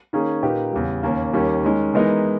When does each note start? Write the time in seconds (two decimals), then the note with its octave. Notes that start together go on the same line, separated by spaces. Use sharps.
0.13 D#3 A#3 C#4 G#4
0.43 A#2 A#3 D#4 G4 B4
0.73 E2 C#3 G3
1.03 D#2 D#3 A#3 C#4
1.33 D#2 D#3 G3 A#3 C#4
1.64 D#3 G#3 C#4
1.94 E3 G#3 B3 D#4 A#4